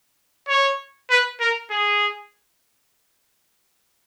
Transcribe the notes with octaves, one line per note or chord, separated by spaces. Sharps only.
C#5
B4
A#4
G#4